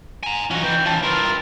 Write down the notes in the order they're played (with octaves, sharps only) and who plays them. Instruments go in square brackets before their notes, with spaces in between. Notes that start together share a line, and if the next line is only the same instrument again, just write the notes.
[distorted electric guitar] G#5 A#5
[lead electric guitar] E3 F4 [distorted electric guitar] C#4 D#4 [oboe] F#4
[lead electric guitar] E3 B4 [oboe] G5
[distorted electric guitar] F3 C#4 [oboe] A5
[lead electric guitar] D4 B4 [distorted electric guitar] E4 A#4 [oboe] F4